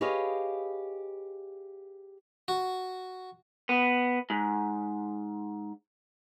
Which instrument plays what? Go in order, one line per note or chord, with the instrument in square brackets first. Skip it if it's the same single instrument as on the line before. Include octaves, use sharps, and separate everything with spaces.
[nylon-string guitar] G4 G#4 B4 C#5 D#5 F5
[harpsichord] F#4
[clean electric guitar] B3
G#2